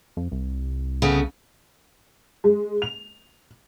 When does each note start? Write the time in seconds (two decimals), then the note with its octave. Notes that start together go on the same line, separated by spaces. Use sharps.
0.17 F2
0.32 C2
1.02 C#3 A3 B3
2.44 G#3
2.82 F7